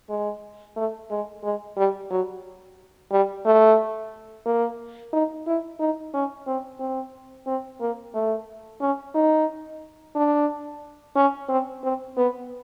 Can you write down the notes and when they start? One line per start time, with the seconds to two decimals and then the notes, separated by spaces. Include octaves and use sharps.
0.09 G#3
0.76 A3
1.11 G#3
1.44 G#3
1.77 G3
2.10 F#3
3.11 G3
3.45 A3
4.46 A#3
5.13 D#4
5.46 E4
5.80 D#4
6.14 C#4
6.47 C4
6.80 C4
7.47 C4
7.81 A#3
8.14 A3
8.81 C#4
9.15 D#4
10.16 D4
11.16 C#4
11.49 C4
11.83 C4
12.17 B3